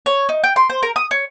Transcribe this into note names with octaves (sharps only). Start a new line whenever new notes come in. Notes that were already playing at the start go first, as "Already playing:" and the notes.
C#5
D#4
G5
C6
C5
A#4
D#6
C#5